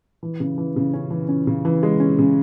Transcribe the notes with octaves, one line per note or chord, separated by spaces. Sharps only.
E3
C#3
E3
C#3
C#4
E3
C#4
C#3
E3
G#3
C#4
C#3